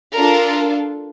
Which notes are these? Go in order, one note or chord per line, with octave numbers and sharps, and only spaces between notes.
D4 F4 A4 A#4